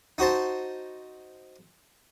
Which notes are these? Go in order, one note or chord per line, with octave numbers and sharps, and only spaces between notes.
D#4 F#4 C5 A5